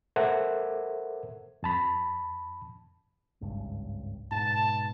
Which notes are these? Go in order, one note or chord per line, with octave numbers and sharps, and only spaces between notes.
A4 A#4 C5 E5 F#5
F2 A5 B5
G#1 C#2 G2
G#2 B2 A5